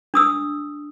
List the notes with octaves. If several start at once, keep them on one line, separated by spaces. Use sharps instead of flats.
D4 D#6 E6